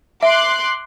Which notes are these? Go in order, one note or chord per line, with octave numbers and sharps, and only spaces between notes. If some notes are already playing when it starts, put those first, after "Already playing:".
E5 C6 D6 F#6